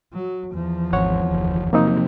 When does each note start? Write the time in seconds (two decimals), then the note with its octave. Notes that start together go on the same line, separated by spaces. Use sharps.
0.13 F#3
0.52 E2 F3
0.93 G#1 C#5 F#5
1.31 F#1 D#2
1.73 C3 F3 F#3 A#3 C4 D#4